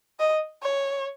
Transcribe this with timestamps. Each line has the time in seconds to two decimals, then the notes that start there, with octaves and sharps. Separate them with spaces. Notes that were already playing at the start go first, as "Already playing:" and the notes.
0.20 D#5
0.63 C#5